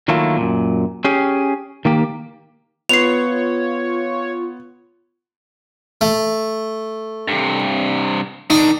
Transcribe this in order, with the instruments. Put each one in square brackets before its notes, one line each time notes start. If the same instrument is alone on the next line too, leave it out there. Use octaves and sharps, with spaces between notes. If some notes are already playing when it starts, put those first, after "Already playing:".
[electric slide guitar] D#3 F#3 A3 A#3 E4 F4
F#2 A#2
C#4 G4 G#4
D#3 A#3 G4
[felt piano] B3 [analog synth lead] F4 [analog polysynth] C#5 [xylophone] C7 F7
[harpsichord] A3
[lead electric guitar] G2 C3
[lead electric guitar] D#3 D4 [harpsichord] D#4